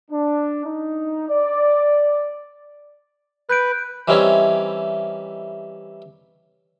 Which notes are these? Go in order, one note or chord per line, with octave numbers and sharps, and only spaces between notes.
D4
D#4
D5
B4 F#6 G6 D7
E3 G3 C4 C#4 D#4 E4